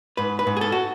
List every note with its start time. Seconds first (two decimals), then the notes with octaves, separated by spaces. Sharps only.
0.17 G#2 B4
0.39 B4
0.47 G#2
0.57 G#4
0.61 A4
0.72 F#4